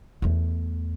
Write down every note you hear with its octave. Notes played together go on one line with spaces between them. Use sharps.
E2 A3